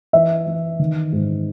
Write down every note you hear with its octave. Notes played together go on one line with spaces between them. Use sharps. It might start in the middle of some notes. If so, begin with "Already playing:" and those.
E3 E5
E3
D#3
G#2